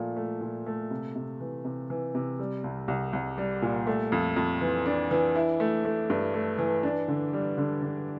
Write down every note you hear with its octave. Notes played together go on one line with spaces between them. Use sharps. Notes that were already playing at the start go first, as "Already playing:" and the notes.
Already playing: A#2 F3 A3
A3
A#2
A3
C3
C3
E3
C3
E3
C3
G3
C2
C2
C2
G3
A#2
A3
F2
F2
E3
D4
E3
E4
A3
A3
G2
A3
E3
D4
D3
G3
D3
D3